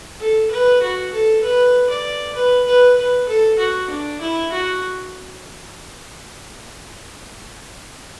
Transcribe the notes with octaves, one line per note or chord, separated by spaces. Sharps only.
A4
B4
F#4
A4
B4
D5
B4
B4
B4
A4
F#4
D4
E4
F#4